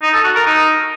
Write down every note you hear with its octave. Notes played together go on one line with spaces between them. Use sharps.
D#4
A4
F#4
A#4
D#4